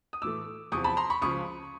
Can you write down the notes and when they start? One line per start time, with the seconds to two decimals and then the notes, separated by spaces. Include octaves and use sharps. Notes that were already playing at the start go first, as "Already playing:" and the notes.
0.13 D#6
0.22 A2 E3 A3 D6 E6
0.72 E2 C3 F3 C#6 D#6
0.84 A5 B5
0.97 A#5 C6
1.10 B5 C#6
1.22 C#2 C#3 F3 C#6 D#6